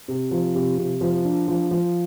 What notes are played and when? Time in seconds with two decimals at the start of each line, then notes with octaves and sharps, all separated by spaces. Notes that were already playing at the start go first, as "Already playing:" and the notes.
0.08 C3
0.31 F3
0.55 C3
0.78 C3
1.01 F3
1.24 D4
1.48 F3
1.71 F3